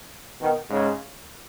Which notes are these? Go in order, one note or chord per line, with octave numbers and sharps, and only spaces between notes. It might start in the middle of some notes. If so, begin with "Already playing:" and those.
B2 D#3
G#2 C#3